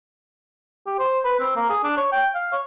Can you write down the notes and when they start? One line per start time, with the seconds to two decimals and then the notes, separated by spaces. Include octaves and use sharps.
0.87 G4
0.99 C5
1.25 B4
1.40 C4
1.56 A#3
1.70 G#4
1.84 D4
1.97 C#5
2.12 G5
2.35 F5
2.52 C#5